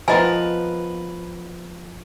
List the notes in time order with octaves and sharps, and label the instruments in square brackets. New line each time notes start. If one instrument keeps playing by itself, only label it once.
[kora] F3 B3 [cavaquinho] A#4 B4 [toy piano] D#5 G#5